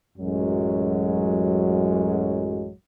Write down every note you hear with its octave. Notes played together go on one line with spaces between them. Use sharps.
A1 F#2 F#3 G#3